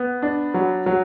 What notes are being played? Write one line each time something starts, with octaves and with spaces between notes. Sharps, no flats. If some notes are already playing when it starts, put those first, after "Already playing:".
Already playing: B3
D4
F#3
F#3